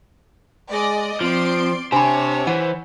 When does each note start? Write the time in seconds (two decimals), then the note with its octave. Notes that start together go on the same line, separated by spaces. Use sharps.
0.69 G#3 D5 D#5
1.21 F3 C4 D5 C6 D7
1.92 D4 G4 C5 C#5 G#5 B5
2.47 E3 C5 F#5